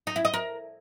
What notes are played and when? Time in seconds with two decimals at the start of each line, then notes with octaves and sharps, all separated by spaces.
0.07 D#4
0.16 E4
0.25 D#5
0.34 A#4